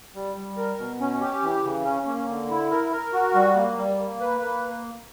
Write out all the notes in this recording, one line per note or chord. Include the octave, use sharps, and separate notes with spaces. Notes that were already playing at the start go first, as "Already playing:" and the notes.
G3
G3
A#4
B2
C#4
G4
E3
C#3
C#4
A#3
D3
E4
A#4
A#4
F#4
G3
A#3
G3
A#3
B4
A#3